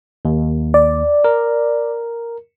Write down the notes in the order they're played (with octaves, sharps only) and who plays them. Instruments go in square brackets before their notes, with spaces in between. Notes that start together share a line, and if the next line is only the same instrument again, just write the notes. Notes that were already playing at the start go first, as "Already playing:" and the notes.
[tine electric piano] D#2
[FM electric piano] D5
[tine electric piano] A#4